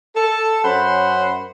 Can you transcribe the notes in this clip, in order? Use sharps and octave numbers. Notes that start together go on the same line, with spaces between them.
A4
F#2 C#4 C5 F#5 B5